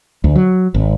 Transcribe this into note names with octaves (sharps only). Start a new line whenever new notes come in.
D2
F#3
G#1